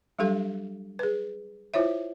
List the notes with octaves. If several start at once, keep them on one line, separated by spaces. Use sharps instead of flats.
F#3 G3 D4 G4 A4 F5
G#4 B4
E4 F4 C5 C#5 E5